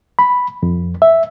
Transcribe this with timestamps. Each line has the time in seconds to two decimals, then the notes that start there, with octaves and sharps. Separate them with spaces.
0.19 B5
0.63 F2
1.02 E5